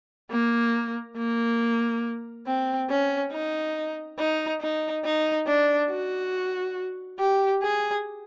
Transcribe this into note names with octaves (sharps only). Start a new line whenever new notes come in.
A#3
A#3
C4
C#4
D#4
D#4
D#4
D#4
D4
F#4
G4
G#4